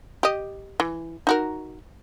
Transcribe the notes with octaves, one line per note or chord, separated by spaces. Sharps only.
G4 D#5
E3
D#4 F#4 A#4